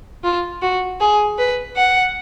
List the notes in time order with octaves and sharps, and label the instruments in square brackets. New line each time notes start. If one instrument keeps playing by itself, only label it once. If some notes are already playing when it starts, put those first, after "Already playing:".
[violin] F4
F#4
G#4
B4
F#5